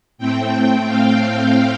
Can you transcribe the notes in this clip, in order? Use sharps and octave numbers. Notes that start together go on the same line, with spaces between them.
A2 A3 C4 G5
F5